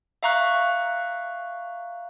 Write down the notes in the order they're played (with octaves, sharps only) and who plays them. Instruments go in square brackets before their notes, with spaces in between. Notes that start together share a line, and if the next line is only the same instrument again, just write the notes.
[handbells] E5 F5 A#5 C#6 F#6